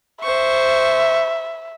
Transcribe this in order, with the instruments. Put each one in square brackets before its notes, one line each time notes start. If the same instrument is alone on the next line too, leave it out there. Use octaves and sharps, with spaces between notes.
[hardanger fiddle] C5 C#6 [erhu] E5